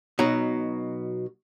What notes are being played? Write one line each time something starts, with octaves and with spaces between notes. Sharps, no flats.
B2 F#3 D#4